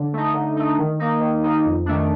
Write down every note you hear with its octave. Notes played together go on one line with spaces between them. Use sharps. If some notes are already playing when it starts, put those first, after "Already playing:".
Already playing: D3
A3 D#4
D3
A3 D#4
D#3
A#3 D#4
D#3
A#3 D#4
F2
D#3 A3 D4